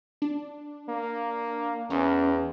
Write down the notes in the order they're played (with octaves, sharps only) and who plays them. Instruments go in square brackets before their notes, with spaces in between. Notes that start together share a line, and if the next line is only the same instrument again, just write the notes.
[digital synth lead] D4
[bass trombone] A#3
[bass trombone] E2 [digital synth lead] C#4